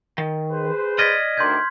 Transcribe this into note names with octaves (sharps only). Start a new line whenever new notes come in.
D#3
G#4 B4 C5
D5 D#5 F6 G#6 B6
D2 D#3 D4 C6 G6 G#6